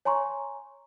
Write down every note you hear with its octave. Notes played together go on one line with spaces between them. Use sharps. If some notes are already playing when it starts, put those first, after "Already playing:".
C#5 G#5 A#5 C6 C#6